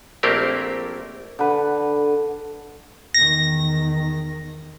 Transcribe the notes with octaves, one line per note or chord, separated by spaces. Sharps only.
A#1 A3 A#3 C4 G4 A#4
D3 B4
E2 D#3 A#6